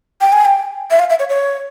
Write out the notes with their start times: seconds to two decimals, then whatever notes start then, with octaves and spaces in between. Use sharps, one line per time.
0.21 G5
0.33 G#5
0.45 G5
0.91 E5
0.99 F5
1.10 E5
1.19 C#5
1.30 C#5